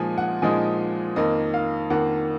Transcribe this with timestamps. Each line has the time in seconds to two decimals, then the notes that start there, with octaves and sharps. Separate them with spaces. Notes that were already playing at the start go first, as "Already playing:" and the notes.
Already playing: A#2 F3 G#3 D#4 G#5
0.18 F#5
0.42 A#2 F3 G#3 D#4 G#5
1.16 F2 D#3 A#3 D#5
1.54 F5
1.90 F2 D#3 A#3 F#5